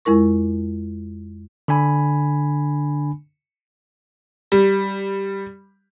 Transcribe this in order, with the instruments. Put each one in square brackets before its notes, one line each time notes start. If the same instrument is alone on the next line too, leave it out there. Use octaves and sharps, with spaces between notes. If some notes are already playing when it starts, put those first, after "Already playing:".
[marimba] F2 G#3 E4 A#4 C#6
[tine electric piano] D3 D4 G#5 B5
[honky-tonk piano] G3